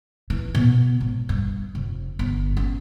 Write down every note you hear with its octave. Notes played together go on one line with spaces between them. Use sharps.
E3
B2
G#1
G2
F1
G1
C#4